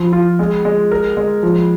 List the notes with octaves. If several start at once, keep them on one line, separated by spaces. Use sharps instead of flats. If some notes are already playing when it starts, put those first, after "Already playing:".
Already playing: F3
F4
G#3
G#3
A#4
G#3
F3